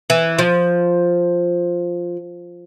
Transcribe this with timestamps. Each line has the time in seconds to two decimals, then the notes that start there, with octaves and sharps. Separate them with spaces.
0.10 E3
0.39 F3